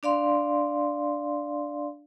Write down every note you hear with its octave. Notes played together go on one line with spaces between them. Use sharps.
D4 D5 F5 C6